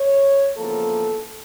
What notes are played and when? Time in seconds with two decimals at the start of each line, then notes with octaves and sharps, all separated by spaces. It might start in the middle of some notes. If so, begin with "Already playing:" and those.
Already playing: C#5
0.57 E2 C#3 F3 A#3 A4